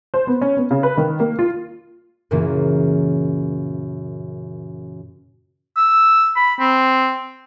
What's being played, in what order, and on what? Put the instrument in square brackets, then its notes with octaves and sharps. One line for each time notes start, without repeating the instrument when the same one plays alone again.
[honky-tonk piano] C5
B3
C#4
B3
C#3
B4
D#3
A#3
F4
[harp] F#2 A#2 C#3 E3 A#3
[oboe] E6
B5
C4